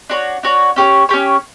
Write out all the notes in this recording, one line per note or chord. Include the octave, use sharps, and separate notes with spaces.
D4 F#4 C#5
D4 F#4 C#5
C#4 G4 C#5
C#4 G4 C#5